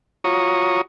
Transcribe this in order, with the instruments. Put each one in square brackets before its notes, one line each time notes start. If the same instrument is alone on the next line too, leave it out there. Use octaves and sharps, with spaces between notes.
[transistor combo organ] F4 F#4 C#5 A#5 C#6 D#6